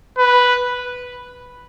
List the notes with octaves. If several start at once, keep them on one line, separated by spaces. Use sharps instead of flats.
B4